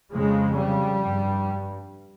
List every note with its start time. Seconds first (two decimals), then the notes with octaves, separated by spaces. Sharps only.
0.12 F2 C#3 G#3
0.57 G3
1.01 G2